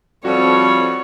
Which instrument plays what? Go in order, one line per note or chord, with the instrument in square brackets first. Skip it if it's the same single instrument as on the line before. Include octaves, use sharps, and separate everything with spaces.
[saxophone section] F3 G3 [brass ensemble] C4 A4 [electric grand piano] F#4 [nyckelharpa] C#5